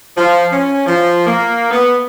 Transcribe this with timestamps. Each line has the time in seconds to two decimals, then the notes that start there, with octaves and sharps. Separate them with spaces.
0.17 F3
0.52 C#4
0.87 F3
1.27 A#3
1.71 B3